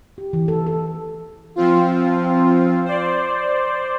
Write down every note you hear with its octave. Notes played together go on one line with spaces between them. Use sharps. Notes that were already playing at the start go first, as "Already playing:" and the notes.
G4
E3
A4
A4
F3 C4 F4
C5 D5